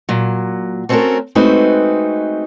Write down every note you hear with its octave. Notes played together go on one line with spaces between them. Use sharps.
A#2 F#3
A3 C4 C#4 F#4 A4 A#4
G#3 A3 C4 D#4 F#4 B4